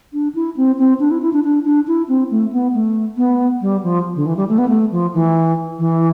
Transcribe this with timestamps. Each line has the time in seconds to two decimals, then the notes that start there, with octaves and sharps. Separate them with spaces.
0.13 D4
0.35 E4
0.56 C4
0.78 C4
1.00 D4
1.11 E4
1.22 E4
1.33 D4
1.44 D4
1.65 D4
1.87 E4
2.08 C4
2.31 A3
2.52 B3
2.74 A3
3.17 B3
3.61 G3
3.83 F3
4.16 D3
4.26 E3
4.37 G3
4.49 A3
4.58 B3
4.69 A3
4.92 F3
5.14 E3
5.79 E3